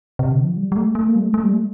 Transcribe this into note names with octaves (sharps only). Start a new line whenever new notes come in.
C3
D3
F3
G3
G3
A3
A3
A#3
G3
A3
A3
G3
A3